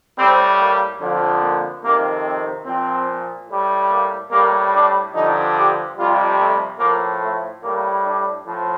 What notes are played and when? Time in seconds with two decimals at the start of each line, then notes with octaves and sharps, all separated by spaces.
0.17 A2 G3 C4
0.59 A#3
1.01 F2 D3 F3
1.42 A#3
1.83 F2 C3 D#3 A#3
2.24 C4
2.66 A#2 F3 C4
3.48 A2 G3
3.90 A#3
4.31 A2 G3 A#3
4.73 D4
5.14 G2 D3 F3 D#4
5.55 G4
5.97 F2 C3 G3 F4
6.38 A3
6.79 A2 F3 A#3
7.22 A3
7.62 A2 G3 A#3
8.04 D4
8.46 A2 F3